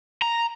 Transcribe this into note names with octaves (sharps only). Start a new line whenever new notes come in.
A#5